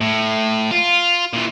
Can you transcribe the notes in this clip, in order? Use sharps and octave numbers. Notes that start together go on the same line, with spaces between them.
A2
F4
A#2 E3